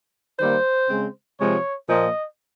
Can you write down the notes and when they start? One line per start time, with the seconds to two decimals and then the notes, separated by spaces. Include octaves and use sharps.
0.39 D#3 G3 A#3 C5
0.88 C#3 G#3 C4
1.39 C3 F3 G#3 C#5
1.89 A#2 F3 A#3 D#5